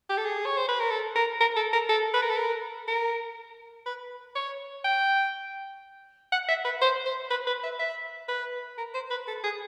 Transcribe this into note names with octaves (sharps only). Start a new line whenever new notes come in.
G4
A4
G#4
C#5
C5
B4
A#4
A4
A#4
A#4
A4
A#4
A4
B4
A#4
A4
A#4
A#4
B4
C#5
G5
F#5
E5
B4
C5
C5
B4
B4
E5
E5
B4
A#4
C5
B4
A4
G#4